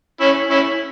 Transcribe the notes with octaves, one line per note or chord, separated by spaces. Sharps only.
C#4 E4
C#4 E4